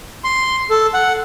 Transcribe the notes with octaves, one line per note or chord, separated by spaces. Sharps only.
C6
A4
F#5